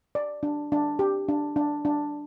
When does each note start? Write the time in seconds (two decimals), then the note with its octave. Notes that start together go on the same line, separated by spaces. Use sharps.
0.15 D5
0.43 D4
0.72 D4
0.99 G4
1.29 D4
1.56 D4
1.85 D4